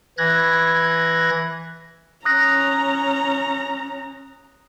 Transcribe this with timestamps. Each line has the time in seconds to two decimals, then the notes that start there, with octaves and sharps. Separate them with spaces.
0.18 E3 F#6 G#6 A#6
2.25 C#4 A#5 D#6 F#6 A#6